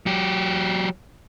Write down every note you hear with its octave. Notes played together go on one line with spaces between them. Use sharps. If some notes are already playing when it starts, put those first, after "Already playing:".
F#3 G4